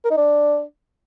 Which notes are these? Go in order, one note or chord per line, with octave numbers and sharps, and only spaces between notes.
A#4
D#4
D4